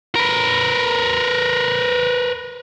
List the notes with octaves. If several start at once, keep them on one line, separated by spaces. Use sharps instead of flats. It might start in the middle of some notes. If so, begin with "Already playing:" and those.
A#4 B4